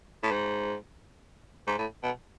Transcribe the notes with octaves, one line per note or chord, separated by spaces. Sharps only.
A2
G#2
G#2
A2
B2